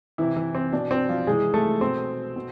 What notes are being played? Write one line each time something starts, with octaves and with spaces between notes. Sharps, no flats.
C3 E3 E4
E3 E4
C4
B2 D4
C4
F3 F4
C3 E3 G#3 G#4
A3 A4
B2 C4 C5
B2